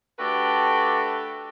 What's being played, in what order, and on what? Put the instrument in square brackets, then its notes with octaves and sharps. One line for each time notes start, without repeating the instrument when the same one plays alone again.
[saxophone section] A3 D4 F#4 G4 A4 B4